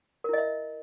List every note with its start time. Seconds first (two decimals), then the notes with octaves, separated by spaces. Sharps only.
0.24 A#4
0.29 E4
0.33 D#5
0.38 E5